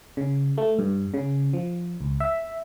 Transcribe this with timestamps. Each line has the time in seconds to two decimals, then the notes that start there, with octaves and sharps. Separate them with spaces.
0.17 C#3
0.58 A3
0.79 G2
1.14 C#3
1.53 F3
2.01 C#2
2.20 E5